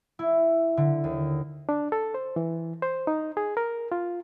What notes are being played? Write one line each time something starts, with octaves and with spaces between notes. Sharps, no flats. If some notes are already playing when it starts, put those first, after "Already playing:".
E4
D3
D#2
D4
A4
C5
E3
C5
D#4
G#4
A#4
F4